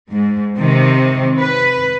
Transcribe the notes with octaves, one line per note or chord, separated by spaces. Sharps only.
G#2
C3 D#3
B4